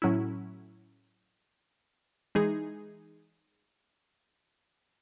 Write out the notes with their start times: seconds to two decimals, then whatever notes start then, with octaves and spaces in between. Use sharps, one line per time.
0.02 A2 F#3 C#4 E4
2.35 E3 G#3 D#4 G#4